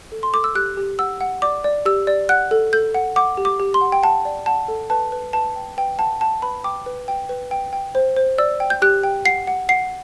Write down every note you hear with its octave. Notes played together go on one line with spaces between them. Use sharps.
A4
C6
A4 D6
E6
G4 F#6
G4
F#5 E6
F#5
D5 D6
D5
G4 E6
D5
F#5 F#6
A4
A4 G6
F#5
F#5 D6
G4
D6
G4
C6
F#5
G5
F#5 A5
D5
F#5 A5
A4
B4 A5
B4
B4 A5
G5
B4 G5
F#5 A5
F#5 A5
B4 B5
G5 D6
B4
G5
B4
G5
G5
C5
C5
D5 E6
G5
G6
G4 F#6
G5
F#5 C7
F#5
F#5 C7